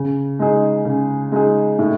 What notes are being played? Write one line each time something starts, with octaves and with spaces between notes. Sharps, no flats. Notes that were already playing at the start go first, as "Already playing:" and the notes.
Already playing: C#3
G#3 D#4 G#4
C#3
G#3 D#4 G#4
A2